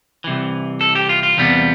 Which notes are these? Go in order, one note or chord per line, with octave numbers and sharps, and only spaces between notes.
C2 C3 E3
A4
G4
F4
F4
E2 C3 G3 B3